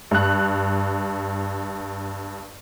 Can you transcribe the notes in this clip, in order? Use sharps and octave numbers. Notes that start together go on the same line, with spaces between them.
G2 F#6